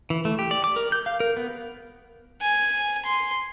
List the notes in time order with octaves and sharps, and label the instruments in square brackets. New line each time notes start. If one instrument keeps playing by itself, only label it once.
[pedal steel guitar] E3
A3
G4
D5
D6
A#4
G6
F5
A#4
B3
[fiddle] G#5
C6